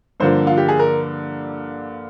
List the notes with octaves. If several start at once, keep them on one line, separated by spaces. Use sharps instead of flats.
G2 D3 F3 A#3 C5
F4
G4
G#4
A#4